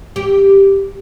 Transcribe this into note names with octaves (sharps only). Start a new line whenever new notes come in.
G4